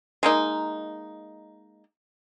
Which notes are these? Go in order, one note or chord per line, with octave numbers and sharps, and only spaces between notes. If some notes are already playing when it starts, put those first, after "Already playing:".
G#3 A#3 D#4